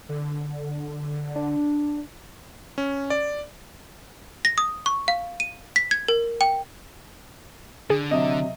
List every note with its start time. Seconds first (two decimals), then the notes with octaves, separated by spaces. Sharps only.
0.09 D3
1.36 D4
2.78 C#4
3.10 D5
4.45 A#6
4.58 D#6
4.86 C#6
5.08 F5
5.40 D#7
5.76 B6
5.91 G#6
6.08 A#4
6.41 G5
7.90 D3 G#4
8.11 C3 F#3 D#5 E5